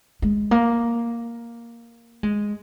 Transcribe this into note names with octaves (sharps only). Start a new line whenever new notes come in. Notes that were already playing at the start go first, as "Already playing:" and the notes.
G#3
A#3
G#3